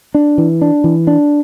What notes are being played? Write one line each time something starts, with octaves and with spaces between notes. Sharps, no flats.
D4
E3
D4
E3
D4